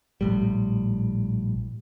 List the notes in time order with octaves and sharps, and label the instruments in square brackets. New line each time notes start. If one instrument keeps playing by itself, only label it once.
[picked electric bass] A#1 A2 G3